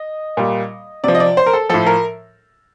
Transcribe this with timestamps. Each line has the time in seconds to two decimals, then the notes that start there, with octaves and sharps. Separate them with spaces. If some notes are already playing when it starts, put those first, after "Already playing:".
Already playing: D#5
0.37 A#2 G3
1.04 C3 F3 D5
1.15 D#5
1.20 D5
1.37 C5
1.46 A#4
1.53 A4
1.69 A2 F3 A4
1.86 A#4